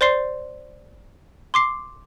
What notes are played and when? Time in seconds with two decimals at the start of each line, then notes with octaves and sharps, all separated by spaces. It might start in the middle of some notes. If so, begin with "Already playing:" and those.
0.01 C5 D5 C6 C7
1.54 C6 D6 C7